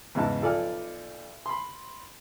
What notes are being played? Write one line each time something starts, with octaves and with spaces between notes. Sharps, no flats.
E2 G#2 C#3 E4 A5
B1 F3 A4 D5 G#5 F6
B5 C6